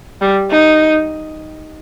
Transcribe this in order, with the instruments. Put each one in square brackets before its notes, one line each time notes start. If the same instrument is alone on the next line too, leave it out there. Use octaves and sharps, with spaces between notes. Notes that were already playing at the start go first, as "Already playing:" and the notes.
[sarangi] G3
D#4